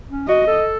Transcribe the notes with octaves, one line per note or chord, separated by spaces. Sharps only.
C#4
F#4 D#5
A4